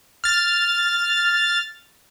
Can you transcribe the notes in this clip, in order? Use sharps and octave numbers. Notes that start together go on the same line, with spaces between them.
F6 A6